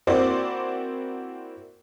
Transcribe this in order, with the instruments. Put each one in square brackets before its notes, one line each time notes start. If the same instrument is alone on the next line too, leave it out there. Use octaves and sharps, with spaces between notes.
[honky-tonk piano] A#3 C4 E4 F#4 C5 D5